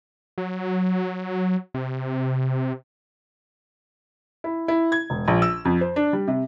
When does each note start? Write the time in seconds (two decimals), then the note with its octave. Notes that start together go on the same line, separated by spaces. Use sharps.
0.38 F#3
1.74 C3
4.44 E4
4.68 E4
4.92 G#6
5.10 E1
5.28 A#1
5.42 E6
5.65 F2
5.81 C5
5.96 D4
6.13 G3
6.28 C3